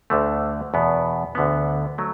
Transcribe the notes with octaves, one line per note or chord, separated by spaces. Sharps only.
D2 D3 A3
E2 B2 B3
D2 D3 B3
F#3 A3